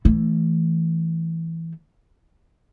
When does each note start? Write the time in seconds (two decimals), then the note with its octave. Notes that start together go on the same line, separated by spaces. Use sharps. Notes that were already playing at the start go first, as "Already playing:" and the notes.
0.05 E3 A3